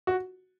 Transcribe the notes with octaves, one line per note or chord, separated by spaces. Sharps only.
F#4